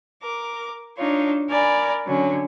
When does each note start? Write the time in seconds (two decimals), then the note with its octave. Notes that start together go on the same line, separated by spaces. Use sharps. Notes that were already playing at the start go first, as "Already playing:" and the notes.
0.22 A#4 D6
0.97 D4 D#4 F4 C#5
1.48 A#4 D5 G#5 B5
2.05 D3 F#3 C#4